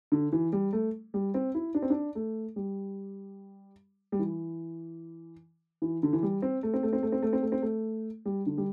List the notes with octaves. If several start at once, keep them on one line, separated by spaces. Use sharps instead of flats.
D3
E3
G3
A3
G3
C4
E4
D4
C4
D4
A3
G3
G3
E3
E3
D3
E3
G3
C4
A3
C4
A3
C4
A3
C4
A3
C4
A3
C4
A3
G3
D3
G3